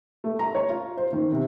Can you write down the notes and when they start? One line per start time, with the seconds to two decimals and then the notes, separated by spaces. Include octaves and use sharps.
0.24 A3
0.39 A#5
0.55 C#5
0.69 F4
0.97 C5
1.13 D#3
1.32 C3